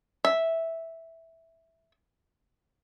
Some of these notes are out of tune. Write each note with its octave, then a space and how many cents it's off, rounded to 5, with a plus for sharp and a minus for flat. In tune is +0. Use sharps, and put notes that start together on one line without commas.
E5 -5